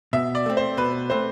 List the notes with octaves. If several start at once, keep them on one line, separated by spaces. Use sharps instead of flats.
B2 E5
D5
A3 C4
C5
B2 B4
A3 C4 C5